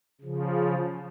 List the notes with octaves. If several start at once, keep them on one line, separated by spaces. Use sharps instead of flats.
C#3 F3